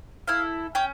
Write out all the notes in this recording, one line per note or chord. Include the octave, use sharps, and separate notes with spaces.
E4 A4 F5
C#4 G5